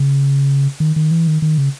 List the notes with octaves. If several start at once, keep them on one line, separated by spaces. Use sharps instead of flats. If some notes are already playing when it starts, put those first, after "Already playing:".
Already playing: C#3
D#3
D#3
E3
D#3
D#3
C#3